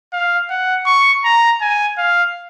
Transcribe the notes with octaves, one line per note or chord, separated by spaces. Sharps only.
F5
F#5
C#6
A#5
G#5
F5